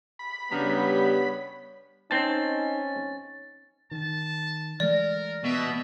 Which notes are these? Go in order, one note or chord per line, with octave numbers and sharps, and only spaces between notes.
B5
C#3 G3 B3 D4 C#5 A#5
C4 C#4 D#4 A5 A6
D#3 A5
E3 G#3 A3 A#4 D5
B2 E5